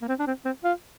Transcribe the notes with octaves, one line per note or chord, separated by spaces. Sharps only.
A#3
C4
D4
C4
C4
F4